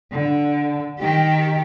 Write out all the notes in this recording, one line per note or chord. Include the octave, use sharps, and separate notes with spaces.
D3
D#3 G4